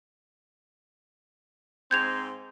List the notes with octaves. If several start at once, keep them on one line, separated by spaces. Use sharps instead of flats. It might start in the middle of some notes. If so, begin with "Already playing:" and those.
G#2 C4 G6 G#6 F7